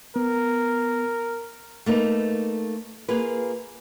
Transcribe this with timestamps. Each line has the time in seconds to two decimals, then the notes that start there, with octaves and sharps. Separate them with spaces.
0.16 B3 A#4
1.86 A3 A#3 D#4 B4
3.08 A#3 F4 G#4 B4